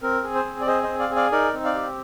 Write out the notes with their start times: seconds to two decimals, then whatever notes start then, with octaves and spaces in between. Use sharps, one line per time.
0.02 C4 A#4
0.24 G#4
0.34 C5
0.46 C4
0.61 D5
0.67 G#4 C5 D#5
0.83 C5 D#5
0.89 C4
0.99 D5 F5
1.11 G#4
1.16 D5 F5
1.32 D#4 A#4 D5
1.54 C4
1.64 D5 F5
1.75 G4